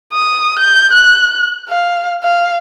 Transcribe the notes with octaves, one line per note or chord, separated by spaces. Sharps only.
D#6
G6
F#6
F5
F5